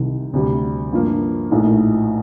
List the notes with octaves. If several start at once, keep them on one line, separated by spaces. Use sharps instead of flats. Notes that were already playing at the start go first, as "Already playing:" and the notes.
Already playing: C2 C3 D#3
D2 C3 G3
G2 F3 A#3
A#1 A2 F3 A3 D#4